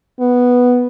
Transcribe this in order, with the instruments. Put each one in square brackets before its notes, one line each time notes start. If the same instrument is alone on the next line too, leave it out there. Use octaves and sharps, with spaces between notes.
[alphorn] B3